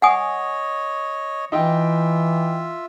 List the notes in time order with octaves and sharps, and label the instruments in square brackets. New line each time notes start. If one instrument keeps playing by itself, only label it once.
[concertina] C#5 D#5 [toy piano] F#5 G#5 D#6
[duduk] E3 [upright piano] D#4 G5 [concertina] F4 E5